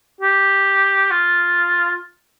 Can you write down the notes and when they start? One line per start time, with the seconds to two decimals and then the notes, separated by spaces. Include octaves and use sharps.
0.21 G4
1.11 F4